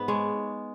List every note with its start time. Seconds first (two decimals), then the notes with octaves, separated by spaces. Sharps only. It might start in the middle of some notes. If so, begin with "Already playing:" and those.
Already playing: G#2 B3
0.08 G#3 C#5